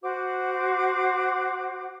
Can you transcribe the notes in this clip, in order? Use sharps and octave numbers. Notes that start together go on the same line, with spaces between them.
F#4 C5 F#5 D6